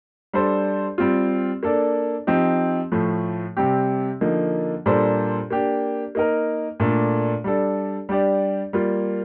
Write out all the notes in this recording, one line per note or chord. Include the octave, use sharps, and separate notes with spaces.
G3 D4 A4 C5
G3 C4 F4
A#3 D4 A4 D5
F3 C4 D#4 G4
A2 F3 A3
C3 G3 C4 G4
D3 F3 A#3 D#4
A#2 G3 D4 A4 C5
A#3 D4 G4
A#3 D#4 A#4
A#2 A3 D4 A4 D5
G3 D4 A4
G3 D4 G4 D5
G3 A#3 F4